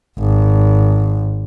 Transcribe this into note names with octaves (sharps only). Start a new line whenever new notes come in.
G#1